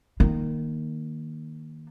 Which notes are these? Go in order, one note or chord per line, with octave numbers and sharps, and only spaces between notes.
D#3 A#3